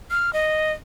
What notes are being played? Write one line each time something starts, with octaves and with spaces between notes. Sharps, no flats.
F6
D#5